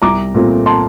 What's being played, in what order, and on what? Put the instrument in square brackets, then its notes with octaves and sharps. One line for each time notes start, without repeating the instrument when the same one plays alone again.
[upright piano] C2 A#5 D6
A#2 A3 C4
A5 C6